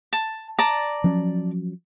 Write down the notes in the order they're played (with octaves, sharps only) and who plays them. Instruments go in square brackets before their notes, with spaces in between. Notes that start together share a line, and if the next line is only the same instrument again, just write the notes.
[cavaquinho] A5
D5 A5 A#5
[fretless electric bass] F3 F#3 C#4